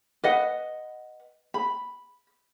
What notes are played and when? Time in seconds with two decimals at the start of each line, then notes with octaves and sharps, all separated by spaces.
0.24 B4 D#5 F#5
1.54 B5